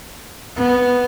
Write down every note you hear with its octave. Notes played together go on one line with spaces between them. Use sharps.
B3